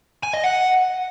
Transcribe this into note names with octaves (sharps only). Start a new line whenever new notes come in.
G#5
D#5
F#5